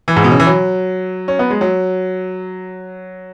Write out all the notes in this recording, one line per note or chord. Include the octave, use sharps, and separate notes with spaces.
E3
G#2
B2
C#3
E3
F#3
C#4
B3
G#3
F#3